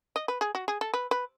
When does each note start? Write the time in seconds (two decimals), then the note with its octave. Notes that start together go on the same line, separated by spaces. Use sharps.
0.16 D#5
0.28 B4
0.41 G#4
0.55 F#4
0.68 G#4
0.81 A4
0.94 B4
1.11 B4